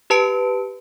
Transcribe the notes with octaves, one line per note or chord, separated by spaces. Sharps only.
G4 B4 A5 C#7 D7